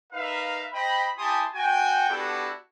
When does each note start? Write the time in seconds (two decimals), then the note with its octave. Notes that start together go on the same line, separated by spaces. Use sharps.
0.13 D#4 A#4 B4 E5 F5
0.73 C5 D#5 G5 B5
1.18 E4 G4 G#5 A5 C6 D#6
1.54 F#4 G5 G#5
2.09 B3 D4 E4 F#4 G4 A4